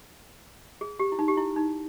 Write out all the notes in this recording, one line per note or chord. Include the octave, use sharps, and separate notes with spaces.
G#4
G4
E4
D#4
G4
E4
D#4